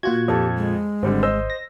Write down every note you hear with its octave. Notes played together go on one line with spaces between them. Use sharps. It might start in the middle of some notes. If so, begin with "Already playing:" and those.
A#2 F4 F#4 F#5 G#6
F2 G4 A4 A5
G#3
G#1 D3 G3 C4
C5 D#5 E6
A#6